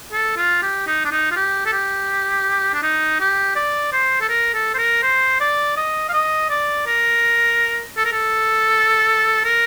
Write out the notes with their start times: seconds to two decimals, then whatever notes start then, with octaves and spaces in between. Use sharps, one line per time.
0.13 A4
0.37 F4
0.63 G4
0.87 D#4
1.05 D4
1.12 D#4
1.31 F4
1.36 G4
1.66 A4
1.73 G4
2.74 D4
2.83 D#4
3.20 G4
3.56 D5
3.93 C5
4.21 A4
4.29 A#4
4.54 A4
4.74 C5
4.78 A#4
5.03 C5
5.41 D5
5.77 D#5
6.09 F5
6.13 D#5
6.50 D5
6.87 A#4
7.97 A4
8.05 A#4
8.13 A4
9.44 A#4